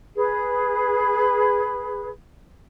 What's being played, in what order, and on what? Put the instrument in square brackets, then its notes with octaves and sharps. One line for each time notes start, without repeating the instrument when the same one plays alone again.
[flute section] G#4 B4